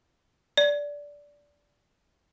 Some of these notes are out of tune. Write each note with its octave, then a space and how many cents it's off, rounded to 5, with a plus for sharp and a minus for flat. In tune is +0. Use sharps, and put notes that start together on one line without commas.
D5 -15